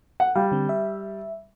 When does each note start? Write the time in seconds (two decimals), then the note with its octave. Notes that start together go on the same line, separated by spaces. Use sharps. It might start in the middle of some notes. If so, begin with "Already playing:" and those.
0.20 F#5
0.35 G3 F5
0.52 D3 C4
0.69 E5